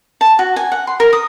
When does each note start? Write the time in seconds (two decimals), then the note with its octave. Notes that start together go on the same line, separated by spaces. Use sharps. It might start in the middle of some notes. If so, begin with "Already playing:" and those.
0.21 A5
0.39 F#4
0.56 G#5
0.72 F#5
0.87 C6
1.00 A#4
1.13 D#6